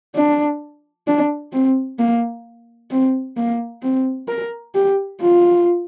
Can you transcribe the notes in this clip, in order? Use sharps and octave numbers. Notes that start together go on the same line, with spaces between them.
D4
D4
C4
A#3
C4
A#3
C4
A#4
G4
F4